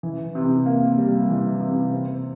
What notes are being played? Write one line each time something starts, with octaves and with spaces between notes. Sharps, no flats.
E3
C3
A#3
G3
E3
C3
C4